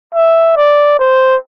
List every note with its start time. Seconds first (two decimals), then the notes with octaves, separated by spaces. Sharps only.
0.14 E5
0.57 D5
0.99 C5